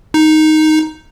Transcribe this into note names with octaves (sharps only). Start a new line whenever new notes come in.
D#4